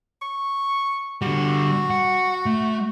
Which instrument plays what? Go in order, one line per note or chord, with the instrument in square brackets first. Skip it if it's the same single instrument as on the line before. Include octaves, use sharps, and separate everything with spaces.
[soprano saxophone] C#6
[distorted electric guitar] D3 G3 [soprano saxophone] F#4
[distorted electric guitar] F#5
A3